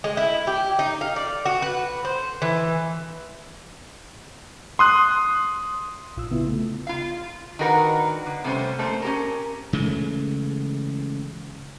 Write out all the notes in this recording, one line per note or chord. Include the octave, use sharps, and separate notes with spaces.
G#3
E4
G4
D#4
F5
D5
F#4
B4
C5
E3
C6 D#6 F#6
A#1 F4 E6
C#3 B3 E4 F4
A3
F4 F5
D#3 D4 F#4 A#4 B4 F#5
D3
C3 G3 A3 C#4 C5
A3 A#3 C5
C#4 G4 A#4
C#3 E3 G#3 A3